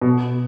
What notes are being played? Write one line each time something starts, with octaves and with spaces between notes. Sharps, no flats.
B2